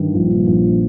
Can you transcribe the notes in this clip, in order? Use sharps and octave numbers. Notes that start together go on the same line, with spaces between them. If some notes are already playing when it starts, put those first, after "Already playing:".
Already playing: G2 D#3
A#1
A#1